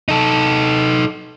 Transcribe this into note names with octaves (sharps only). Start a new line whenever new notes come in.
D#4 A4